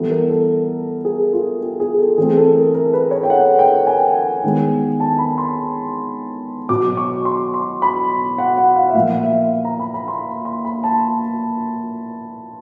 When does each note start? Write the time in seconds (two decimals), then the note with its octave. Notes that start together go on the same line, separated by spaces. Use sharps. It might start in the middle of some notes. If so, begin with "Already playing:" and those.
Already playing: E3 G3 B3 A4
0.11 A#4
0.29 A4
1.05 G#4
1.33 F4
1.61 G4
1.80 G#4
1.98 A4
2.18 E3 A3 C4 G#4
2.37 A4
2.55 A#4
2.75 A#4
2.93 B4
3.11 C#5
3.23 G5
3.30 F#5
3.59 G5
3.87 G#5
4.44 D#3 G#3 B3
5.00 A5
5.18 B5
5.38 C6
6.69 B2 F#3 B3 D6
6.97 C#6
7.25 C6
7.54 C6
7.82 B5
8.38 F#5
8.57 F#5
8.76 F5
8.90 E5
8.94 A#2 F3 A#3 F5
9.12 F5
9.24 E5
9.65 A#5
9.80 B5
9.94 B5
10.08 C6
10.45 C6
10.65 B5
10.84 A5